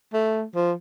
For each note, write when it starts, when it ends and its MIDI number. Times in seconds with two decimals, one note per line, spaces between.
0.14 0.44 57
0.55 0.73 53